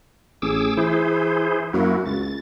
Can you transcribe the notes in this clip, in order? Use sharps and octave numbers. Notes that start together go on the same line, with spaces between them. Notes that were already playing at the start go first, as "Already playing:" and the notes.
A1 G#4 D6 E6
E3 E4 G#4 C5
F#2 A#3 E4 F#4
C#2 A6